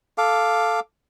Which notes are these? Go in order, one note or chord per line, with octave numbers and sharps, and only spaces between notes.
A4 F5 D6